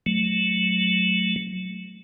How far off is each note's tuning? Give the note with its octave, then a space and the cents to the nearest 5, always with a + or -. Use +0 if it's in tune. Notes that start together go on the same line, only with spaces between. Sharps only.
F#3 +0 A3 -15